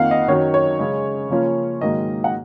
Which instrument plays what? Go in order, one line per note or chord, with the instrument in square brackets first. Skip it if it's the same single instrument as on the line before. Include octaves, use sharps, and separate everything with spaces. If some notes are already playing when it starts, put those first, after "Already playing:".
Already playing: [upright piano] F2 D#3 A#3 F4 F5 F#5
D#5
F#2 D#3 F#3 C#5
C#5
C#3 G#3 C#4
C#3 F3 A#3 C#4 F4
G#2 D#3 F#3 A#3 D#5
F#5